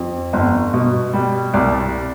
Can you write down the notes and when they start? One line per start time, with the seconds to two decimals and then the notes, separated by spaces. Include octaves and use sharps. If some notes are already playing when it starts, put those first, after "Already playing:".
Already playing: F2
0.33 G1
0.74 B2
1.14 G3
1.54 C2 D5